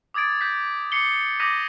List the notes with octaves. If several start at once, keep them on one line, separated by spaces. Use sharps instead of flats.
D6 D#6 G#6 A6 D7
G6 B6
D6 C7 C#7 G7
D6 D#6 G6 A#6 B6 D#7